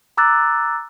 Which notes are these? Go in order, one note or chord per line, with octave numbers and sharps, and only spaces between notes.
A#5 D6 E6 F#6 A6